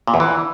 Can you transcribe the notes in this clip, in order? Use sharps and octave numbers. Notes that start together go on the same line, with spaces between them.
A#2
E2
E3